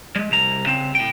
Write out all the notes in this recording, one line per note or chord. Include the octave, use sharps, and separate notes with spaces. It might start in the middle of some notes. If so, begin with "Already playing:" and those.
G3 G#3
C2 A#5
C#3 C4
A2 G5